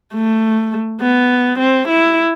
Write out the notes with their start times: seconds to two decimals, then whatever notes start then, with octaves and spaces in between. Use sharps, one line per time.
0.14 A3
1.01 B3
1.59 C4
1.88 E4